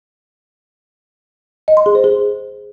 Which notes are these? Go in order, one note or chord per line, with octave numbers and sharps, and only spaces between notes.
D#5
C6
G#4
C5
G#4